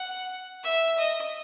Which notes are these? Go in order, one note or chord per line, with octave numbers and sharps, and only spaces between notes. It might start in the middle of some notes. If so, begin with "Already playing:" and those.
Already playing: F#5
E5
D#5